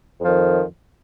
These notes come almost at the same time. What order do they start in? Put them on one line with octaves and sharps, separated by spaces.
F2 F3 D#3